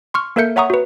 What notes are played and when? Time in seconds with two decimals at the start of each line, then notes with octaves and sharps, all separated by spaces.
0.14 C6 C#6 F6
0.36 A#3 A4 A#4 E5 G6 C#7
0.56 C#5 E5 F#5 A#5 C#6 D#6
0.70 F#4 B4